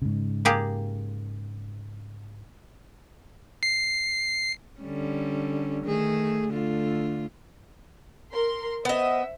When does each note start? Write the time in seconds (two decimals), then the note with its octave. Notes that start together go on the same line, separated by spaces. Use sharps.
0.02 G#2 C#3
0.45 A#3 G4 G#4
3.63 C7
4.80 D3 G3 C#4
5.84 D#3 A3 G#4
6.49 D3 A3 F4
8.32 A#4 C6
8.85 B3 C5 D#5 E5